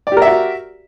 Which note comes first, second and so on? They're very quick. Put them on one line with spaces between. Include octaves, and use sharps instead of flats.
D5 G4 A#4 E5 F#4